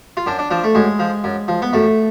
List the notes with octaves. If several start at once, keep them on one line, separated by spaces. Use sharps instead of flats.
F4
F#2 D4
D4
F3 D4
A3
F#2 G#3
F3
F#2
F3
B3
F#2 A3